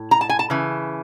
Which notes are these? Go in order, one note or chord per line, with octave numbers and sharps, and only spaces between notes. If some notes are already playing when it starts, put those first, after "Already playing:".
Already playing: A2
A#5
A5
G#5
A5
C#3 E3